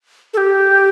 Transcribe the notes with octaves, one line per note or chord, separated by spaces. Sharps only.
A4
G4